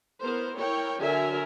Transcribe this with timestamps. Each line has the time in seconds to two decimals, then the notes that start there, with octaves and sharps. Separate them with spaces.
0.23 B3 E4 A#4 C5
0.56 E4 A#4 C#5 G5
1.00 D3 F#3 A#4 E5 G#5